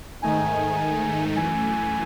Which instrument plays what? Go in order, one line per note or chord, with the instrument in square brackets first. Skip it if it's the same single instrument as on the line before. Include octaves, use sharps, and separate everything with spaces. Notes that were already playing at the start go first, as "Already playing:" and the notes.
[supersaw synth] G#2 D#3 A3 D#4 [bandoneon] G#5
[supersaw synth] F#2 E3 A3 [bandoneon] G#5